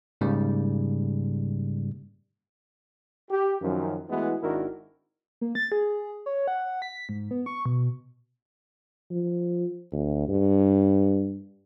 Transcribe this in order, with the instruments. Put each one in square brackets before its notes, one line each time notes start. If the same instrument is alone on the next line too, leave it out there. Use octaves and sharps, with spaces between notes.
[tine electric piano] G#2 C#3 G3 A#3
[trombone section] G4
F#2 D#3 F3
E3 G#3 A3 B3 E4 F#4
G#1 D#3 D4 E4 F#4 A#4
[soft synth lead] A#3
A6
G#4
C#5
F#5
B6
G#2
B3
C#6
B2
[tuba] F3
D2
G2